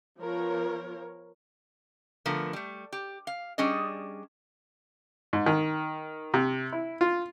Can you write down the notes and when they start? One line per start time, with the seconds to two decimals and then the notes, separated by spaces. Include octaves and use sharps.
0.21 F3 B3 A#4 C#5
2.26 D3 F3 A3 B3 A#4
2.53 G3 A3
2.92 G4
3.27 F5
3.58 G3 C#4 D4 G#4 D#5
5.33 G#2
5.46 D#3
6.34 C3
6.72 E4
7.01 F4